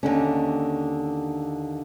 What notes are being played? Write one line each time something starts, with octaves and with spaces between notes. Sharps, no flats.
D#2 D3 C#4